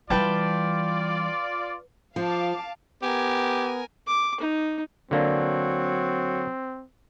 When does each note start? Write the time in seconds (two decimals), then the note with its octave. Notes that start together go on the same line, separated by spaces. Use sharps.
0.10 E3 G3 F4 B4 D5 G5 A5
2.16 F3 F5 A5 D6
3.02 B3 G4 A#4 G#5
4.07 D6
4.40 D#4
5.11 D3 F#3 A#3 C4 D4